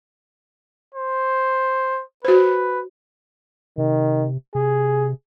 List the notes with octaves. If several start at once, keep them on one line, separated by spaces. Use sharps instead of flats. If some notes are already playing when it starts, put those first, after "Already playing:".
C5
F#4 B4 C5
C3 D#3
C3 G#4